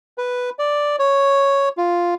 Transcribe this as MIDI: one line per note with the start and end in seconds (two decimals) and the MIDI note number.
0.18 0.50 71
0.59 0.96 74
0.99 1.69 73
1.77 2.14 65